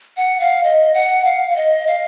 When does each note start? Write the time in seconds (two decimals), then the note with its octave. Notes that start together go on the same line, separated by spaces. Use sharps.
0.17 F#5
0.40 F5
0.64 D#5
0.94 F#5
1.25 F5
1.50 F5
1.56 D#5
1.87 F5